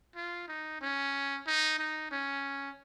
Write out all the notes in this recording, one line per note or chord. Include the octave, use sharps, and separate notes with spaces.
F4
D#4
C#4
D#4
D#4
C#4